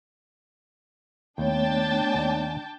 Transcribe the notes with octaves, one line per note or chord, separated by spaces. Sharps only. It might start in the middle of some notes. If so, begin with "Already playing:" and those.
D#2 A3 B3 D4 C#5 G5 A5
D#2 D5